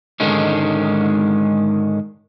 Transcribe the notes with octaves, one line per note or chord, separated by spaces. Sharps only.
G#2 D3 D#3 G#3 C#4